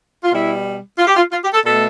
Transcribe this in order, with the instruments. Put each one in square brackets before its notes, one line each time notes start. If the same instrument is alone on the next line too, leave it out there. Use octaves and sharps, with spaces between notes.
[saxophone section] F4
B2 G3 E4
F4
G4
F4
F4
G4
A4
B2 A3 A4